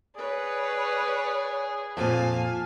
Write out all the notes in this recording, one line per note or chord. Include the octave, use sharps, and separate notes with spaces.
G#4 B4 C#5 D5
F2 A#2 F5 G#5 A5